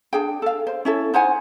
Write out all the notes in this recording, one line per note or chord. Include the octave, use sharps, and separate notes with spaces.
D4 G#4 G5
A4 F5
C5
C#4 E4 A4
D#4 C5 F#5 G#5